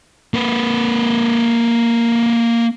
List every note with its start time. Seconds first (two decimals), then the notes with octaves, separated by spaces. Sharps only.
0.34 A#3 B4